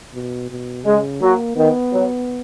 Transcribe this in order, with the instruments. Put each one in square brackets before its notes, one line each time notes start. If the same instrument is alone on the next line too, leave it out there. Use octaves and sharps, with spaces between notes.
[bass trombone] B2
B2
[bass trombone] C#3 [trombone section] G#3
[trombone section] F#3 [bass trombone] A#3
[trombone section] D#3 [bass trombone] B3
[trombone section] F#3